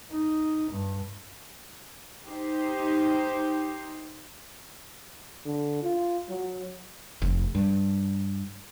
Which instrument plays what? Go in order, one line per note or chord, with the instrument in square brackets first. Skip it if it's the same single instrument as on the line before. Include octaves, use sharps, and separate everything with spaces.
[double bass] D#4
G2
[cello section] D#4 G4 C5
[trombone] D3
F4
F#3
[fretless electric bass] F1
G2